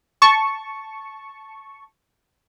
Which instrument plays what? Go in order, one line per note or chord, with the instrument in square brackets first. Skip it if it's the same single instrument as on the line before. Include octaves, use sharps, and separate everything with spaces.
[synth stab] A5 C#6